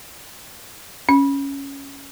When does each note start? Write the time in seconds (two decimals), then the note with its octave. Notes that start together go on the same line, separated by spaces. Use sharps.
1.09 C#4